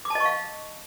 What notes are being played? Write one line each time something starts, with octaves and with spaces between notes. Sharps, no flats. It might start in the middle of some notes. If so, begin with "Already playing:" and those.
D6
A5
D#5
C#6
F5